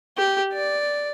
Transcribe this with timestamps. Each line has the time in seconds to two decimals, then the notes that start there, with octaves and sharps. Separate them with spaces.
0.17 G4
0.53 D5